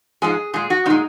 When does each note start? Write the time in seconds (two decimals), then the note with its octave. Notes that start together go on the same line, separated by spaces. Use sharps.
0.22 G#2 F3 G#3 G#4
0.54 A#2 G#3 G#4
0.70 F#4
0.86 A#2 G#3 D#4